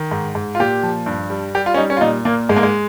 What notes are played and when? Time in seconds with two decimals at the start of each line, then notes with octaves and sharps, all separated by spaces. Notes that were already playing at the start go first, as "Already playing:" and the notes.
Already playing: D#3
0.11 G#2
0.35 G#2
0.55 F4
0.60 A#2 G4
0.83 F3
1.06 G2
1.30 G3
1.55 G3 G4
1.66 F4
1.74 C#4
1.77 G3 D#4
1.90 C#4
1.97 F4
2.01 A#2 D#4
2.25 A#2 A#3
2.49 G#2 G#3
2.56 A#3
2.63 G#3